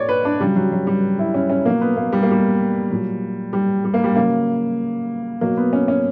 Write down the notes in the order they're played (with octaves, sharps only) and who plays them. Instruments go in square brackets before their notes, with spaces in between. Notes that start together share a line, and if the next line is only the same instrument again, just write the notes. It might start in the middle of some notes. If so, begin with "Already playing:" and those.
Already playing: [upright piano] A#2 C#5 D5
B4
D4
C#3 F#3 G3
F#3
F#3
G3
E4
C#4
C#4
B2 F#3 A#3
B3
A#3
G3
A#3
G3
A#2 F#3
G3
G3
A#3
G3
C#3 F#3 A#3
B2 F#3 A#3
B3
C#4
C#4